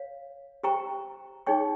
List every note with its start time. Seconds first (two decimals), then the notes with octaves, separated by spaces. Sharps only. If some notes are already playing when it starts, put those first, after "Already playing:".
Already playing: C#5 F5
0.63 G4 C5 G5 A#5 C#6
1.47 D#4 G#4 C#5 G5 C#6